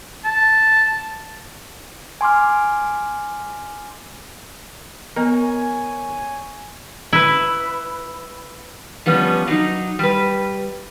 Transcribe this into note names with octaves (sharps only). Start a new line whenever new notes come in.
A5
G#5 C6 D6 F6
B3 A#4 C#5 D#5 G#5
E4 B4
F3 G3 B3 C#4
F#3 D#4
G3 B4